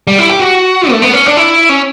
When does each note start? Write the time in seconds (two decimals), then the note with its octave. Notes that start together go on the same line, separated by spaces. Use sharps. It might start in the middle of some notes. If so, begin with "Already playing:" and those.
0.07 G3
0.18 E4
0.29 G4
0.40 F#4
0.91 A3
1.02 B3
1.14 C#4
1.26 D4
1.37 E4
1.69 C#4